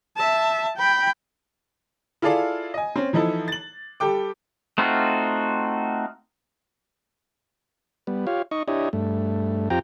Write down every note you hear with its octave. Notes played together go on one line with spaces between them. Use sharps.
E5 A5
G5 B5
E4 F4 G#4 A4 D5 F5
D#5 G#5
C4 C#4
E3 F3 D#4 E4 A4
A6 F#7
G3 G4 A4 G5 D6
A3 C4 D#4 F4 F#4
G3 B3
F4 G4 C#5 F5
D#4 D#5 C#6
D4 E4 G4 C#5 D#5
G2 A3
F2 C4 F4 G4 G5 A#5